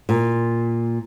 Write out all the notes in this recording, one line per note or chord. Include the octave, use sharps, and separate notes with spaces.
A#2